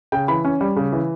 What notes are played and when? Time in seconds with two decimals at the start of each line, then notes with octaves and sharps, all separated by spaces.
0.12 C#3 G5
0.28 E3 B5
0.45 C#4
0.61 G3
0.76 C#3
0.92 E3